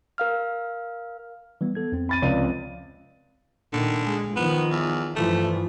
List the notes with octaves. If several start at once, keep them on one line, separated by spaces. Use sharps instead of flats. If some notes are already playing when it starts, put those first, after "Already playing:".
A#4 F5 F6
E3 G3 B3
B3 A4 G#6
F2 C4
B5 A6 D#7
C#2 F3 C4 D5 D#7
A#2 D3 D#3
G#3
D#3 F3 B3
E2
G2 E3 F3 A3